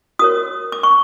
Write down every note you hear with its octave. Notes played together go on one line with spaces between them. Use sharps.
F#4 A#4 C#5 D#6
D6
C#6